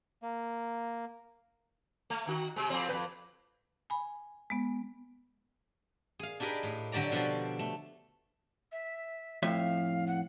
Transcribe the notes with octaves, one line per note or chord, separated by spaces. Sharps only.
A#3
A3
D#3 F#4
C3 G#3
F2 C4
F2 B2 B4
G#5 B5
G#3 B3
G#4 F5
D4 D#4 G4 G#4 A#4 B4
A2
D3 F#3 G4 D5 A#5
B2 D3 F3 D4 F#4 G4
A3
E5
F2 A2 E5 F5
F#5